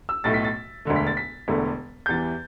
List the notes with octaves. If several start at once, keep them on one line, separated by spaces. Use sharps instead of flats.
E6
B1 A2 A3 A6
B6
A6
E1 D2 D3 A3
B6
A6
B6
E1 E2 D3 A3
G6
E2 E3 G3 A6